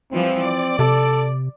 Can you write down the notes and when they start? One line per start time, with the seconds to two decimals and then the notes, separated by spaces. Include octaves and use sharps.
0.11 E3 F3 G3 C4
0.41 D5
0.79 C3 A4